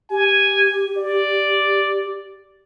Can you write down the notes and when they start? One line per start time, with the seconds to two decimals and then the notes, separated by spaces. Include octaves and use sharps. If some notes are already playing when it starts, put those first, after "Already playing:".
0.11 G4 G#5
0.97 D5